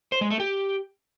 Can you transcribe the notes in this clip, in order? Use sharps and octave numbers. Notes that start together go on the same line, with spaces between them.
C5
G#3
A3
G4